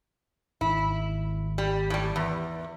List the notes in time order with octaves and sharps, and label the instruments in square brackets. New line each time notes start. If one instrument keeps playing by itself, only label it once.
[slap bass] G#1 [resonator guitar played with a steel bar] E4
[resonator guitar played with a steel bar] G3
A2 G3
E2